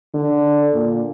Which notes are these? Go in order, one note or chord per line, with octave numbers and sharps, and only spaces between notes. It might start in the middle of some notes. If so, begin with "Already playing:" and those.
D3
A#2